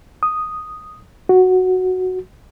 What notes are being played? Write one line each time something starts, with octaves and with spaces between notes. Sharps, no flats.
D#6
F#4